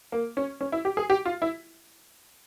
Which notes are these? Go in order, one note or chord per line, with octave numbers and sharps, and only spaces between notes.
A#3
C#4
C#4
E4
G4
G#4
G4
F4
E4